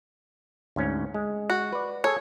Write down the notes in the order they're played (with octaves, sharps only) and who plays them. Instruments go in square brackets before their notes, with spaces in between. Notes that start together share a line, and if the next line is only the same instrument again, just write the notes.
[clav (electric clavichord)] D2 G#2 C#4
G#3
[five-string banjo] F#4
[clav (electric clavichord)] B4 D5
[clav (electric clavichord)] G#4 A4 G#5 [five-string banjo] C#5